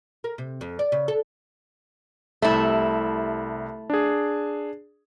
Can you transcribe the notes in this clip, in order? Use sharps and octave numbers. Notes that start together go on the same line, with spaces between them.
A#4
C3
F2
D5
C#3
A4
C2 C3 A3 E4
D4 G#4